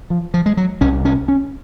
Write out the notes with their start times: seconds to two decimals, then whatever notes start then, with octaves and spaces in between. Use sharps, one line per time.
0.10 F3
0.34 F3
0.46 G#3
0.57 F#3
0.81 C2 C3 C#4
1.05 C#4
1.28 C#4